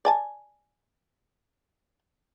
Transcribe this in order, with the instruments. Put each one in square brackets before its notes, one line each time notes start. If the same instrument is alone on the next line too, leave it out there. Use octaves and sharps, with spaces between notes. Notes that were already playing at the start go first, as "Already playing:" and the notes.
[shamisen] D5 G#5 A5